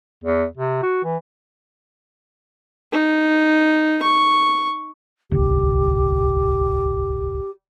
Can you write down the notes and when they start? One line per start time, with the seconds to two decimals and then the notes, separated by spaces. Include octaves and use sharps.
0.24 E2
0.58 C3
0.83 F#4
1.05 E3
2.92 D#4
4.03 C#6
5.31 D1 G1 C2 G4